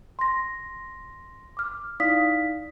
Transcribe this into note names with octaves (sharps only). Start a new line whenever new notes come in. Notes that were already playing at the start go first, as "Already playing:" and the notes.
C6 A#6
D6 F6
D#4 E4 D5 F5 D#6 B6